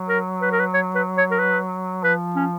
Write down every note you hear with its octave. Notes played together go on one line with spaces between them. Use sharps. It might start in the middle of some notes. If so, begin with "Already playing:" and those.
Already playing: F#3
A#4
B4
A#4
B4
C#5
B4
C#5
A#4
B4
F3 B4
C#4